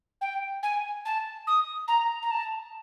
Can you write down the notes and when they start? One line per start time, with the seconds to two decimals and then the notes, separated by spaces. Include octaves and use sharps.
0.21 G5
0.62 G#5
1.05 A5
1.47 D#6
1.87 A#5
2.22 A#5
2.31 A5